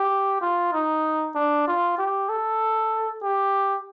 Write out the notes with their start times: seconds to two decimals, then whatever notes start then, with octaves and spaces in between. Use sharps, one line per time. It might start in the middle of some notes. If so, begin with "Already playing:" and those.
Already playing: G4
0.41 F4
0.73 D#4
1.35 D4
1.67 F4
1.98 G4
2.29 A4
3.23 G4